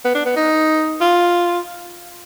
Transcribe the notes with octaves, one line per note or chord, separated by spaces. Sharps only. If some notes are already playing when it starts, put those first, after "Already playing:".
B3
D4
B3
D#4
F4